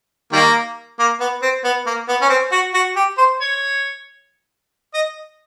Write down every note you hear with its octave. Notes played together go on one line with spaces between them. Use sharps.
D#3 G3 A#3
A#3
B3
C4
B3
A#3
B3
C#4
C4
F#4
F#4
G4
C5
C#5
D#5